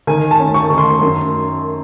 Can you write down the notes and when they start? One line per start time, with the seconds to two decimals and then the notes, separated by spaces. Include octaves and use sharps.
0.07 D#3 G#5
0.31 A5
0.39 C#4
0.54 C#6
0.70 D#3
0.78 C6
1.01 F#2